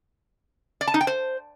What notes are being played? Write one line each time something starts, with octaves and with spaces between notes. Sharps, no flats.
D5
A5
D#4
G5
C5